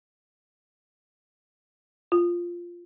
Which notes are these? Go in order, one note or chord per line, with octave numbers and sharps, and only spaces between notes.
F4